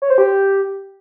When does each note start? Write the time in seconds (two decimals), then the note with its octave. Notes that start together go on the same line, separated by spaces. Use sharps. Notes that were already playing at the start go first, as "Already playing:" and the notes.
0.02 C#5
0.10 C5
0.18 G4